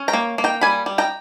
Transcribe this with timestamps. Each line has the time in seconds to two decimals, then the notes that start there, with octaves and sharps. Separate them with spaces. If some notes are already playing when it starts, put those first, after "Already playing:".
Already playing: C#4
0.08 G5 A#5
0.13 A#3
0.38 A#3
0.44 G5 A#5
0.61 G3 G#5 B5
0.86 G3
0.98 G5 A#5